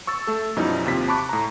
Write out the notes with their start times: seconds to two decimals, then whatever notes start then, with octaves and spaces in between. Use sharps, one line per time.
0.07 C#6 E6 A6
0.27 A3 A4
0.56 F#2 B2 F3 G3 D#4 E4
0.86 D#2 C3 F4 B6
1.08 A5 B5 C#6 D6 F#6
1.29 A2 A#5